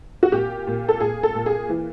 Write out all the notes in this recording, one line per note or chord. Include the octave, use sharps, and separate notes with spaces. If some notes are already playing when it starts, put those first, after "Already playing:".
F#4
A#2 G4
A#2
A4
A#2 G#4
A4
A#2
G#4
E3